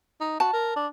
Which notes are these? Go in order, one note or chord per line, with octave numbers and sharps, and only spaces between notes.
D#4
F#4 A5
A#4
D4